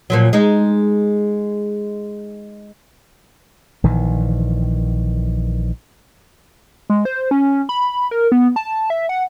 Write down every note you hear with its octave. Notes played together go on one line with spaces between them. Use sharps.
A#2 F3 F#3
G#3 D#4
A#1 D#3 E3
G#3
C5
C#4
B5
A#4
B3
A5
E5
F#5